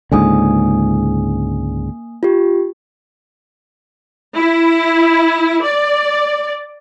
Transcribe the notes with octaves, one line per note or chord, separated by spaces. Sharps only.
C#2 G#2 D3 A#3 G#5 D#6
F4 G4
E4
D5